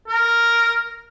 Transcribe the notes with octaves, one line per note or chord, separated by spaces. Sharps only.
A#4